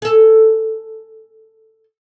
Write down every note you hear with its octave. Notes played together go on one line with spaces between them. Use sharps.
G#4 A4